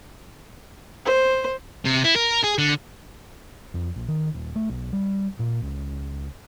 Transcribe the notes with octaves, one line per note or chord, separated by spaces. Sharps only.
C5
C3
E4
A#4
G#4
D3
F2
A#1
D#3
D#1
A3
B1
G3
A#2
C#2